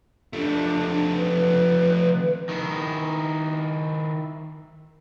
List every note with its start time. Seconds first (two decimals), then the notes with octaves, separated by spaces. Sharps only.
0.33 F3 A3 D4
1.13 B4
2.49 D#3 E4